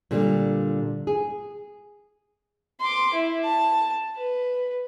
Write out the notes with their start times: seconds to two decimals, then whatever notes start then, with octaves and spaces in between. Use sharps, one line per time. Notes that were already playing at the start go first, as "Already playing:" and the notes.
0.11 A#2 D3 G3
1.07 G#4
2.80 C6 D6
3.14 E4
3.44 A5
4.17 B4